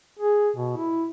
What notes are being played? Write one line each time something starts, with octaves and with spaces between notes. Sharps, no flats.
G#4
B2
E4